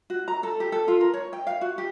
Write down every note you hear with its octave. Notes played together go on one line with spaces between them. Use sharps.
F#4
A#5
A4
G4
A4
F4
A#4
C#5
G5
F5
F#4
G4